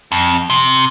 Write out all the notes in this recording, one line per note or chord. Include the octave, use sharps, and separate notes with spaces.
F2
C3